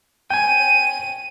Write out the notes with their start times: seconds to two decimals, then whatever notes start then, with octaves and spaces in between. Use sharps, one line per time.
0.30 G5 G#5 D#7